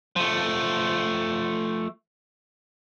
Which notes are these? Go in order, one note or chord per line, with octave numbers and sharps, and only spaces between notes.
F3 A3